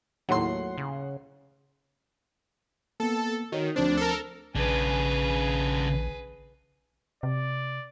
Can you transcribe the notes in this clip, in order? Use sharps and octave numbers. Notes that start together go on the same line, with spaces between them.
D#2 A2 F#3 F#5 C6 C7
C#3
A#3 B3 A4
D#3 F#4 C#5
D2 F3 C4 D4 C5
A4 A#4
A#1 C#3 D4 G#4 B4
C3 D5